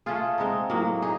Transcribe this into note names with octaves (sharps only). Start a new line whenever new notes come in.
A3 C#4 F4 G#4
G#3 C4 D#4
A2 F#3 A#3
D#4 G#4